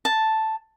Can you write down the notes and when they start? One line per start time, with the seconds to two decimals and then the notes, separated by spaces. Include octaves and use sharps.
0.05 A5